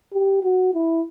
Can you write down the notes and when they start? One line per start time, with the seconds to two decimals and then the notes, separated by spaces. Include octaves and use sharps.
0.13 G4
0.43 F#4
0.74 E4